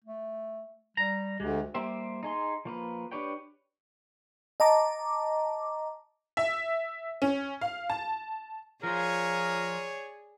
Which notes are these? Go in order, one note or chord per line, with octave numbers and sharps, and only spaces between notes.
A3
G3 A#5
D2 G#3 G4
G3 A#3 G4 C5 E5
D#4 G#4 C6
F3 A#3 B4
D4 G4 B4 C#5 G5
D#5 A5 A#5 D6
E5
C#4
F5
A5
F3 F4 G#4 A#4 C#5 D5